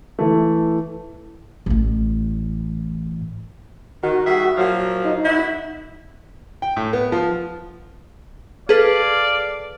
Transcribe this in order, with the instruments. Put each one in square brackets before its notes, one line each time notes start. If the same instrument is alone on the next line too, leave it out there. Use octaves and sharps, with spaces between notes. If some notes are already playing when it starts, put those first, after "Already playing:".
[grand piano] E3 A3
[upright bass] A1 A2
[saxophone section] D#3 [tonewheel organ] F#4
[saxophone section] G3 G#4 E5
A#2 F3 F#3
[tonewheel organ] D#4
[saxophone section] E4 F#4
[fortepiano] G5
A2
B3
F3
[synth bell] G#4 B4 [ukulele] A4 [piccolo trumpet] D5 [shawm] F5